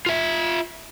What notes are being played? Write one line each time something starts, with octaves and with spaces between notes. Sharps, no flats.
F4 E5